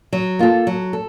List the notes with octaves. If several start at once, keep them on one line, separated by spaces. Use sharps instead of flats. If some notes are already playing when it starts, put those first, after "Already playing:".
F#3
A#3 F4 A4
F#3
A4